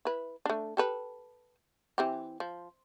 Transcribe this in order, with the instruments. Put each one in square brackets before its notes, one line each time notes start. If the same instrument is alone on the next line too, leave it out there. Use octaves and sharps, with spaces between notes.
[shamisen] E4 B4
A3 D4
G4 A4 B4
E3 C4 G4
F3